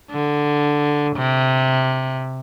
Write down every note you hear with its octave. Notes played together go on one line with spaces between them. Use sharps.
D3
C3